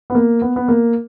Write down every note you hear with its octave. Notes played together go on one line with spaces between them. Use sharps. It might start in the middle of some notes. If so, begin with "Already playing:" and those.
B3
A#3
B3
B3
A#3